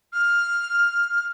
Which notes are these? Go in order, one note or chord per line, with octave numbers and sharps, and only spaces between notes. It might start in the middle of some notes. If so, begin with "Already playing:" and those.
F6